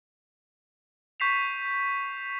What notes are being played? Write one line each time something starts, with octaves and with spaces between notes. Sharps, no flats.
C#6 G6 B6 C7 E7 F7